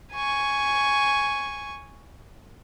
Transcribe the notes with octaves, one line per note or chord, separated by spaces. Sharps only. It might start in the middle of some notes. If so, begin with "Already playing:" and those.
G#5 C#6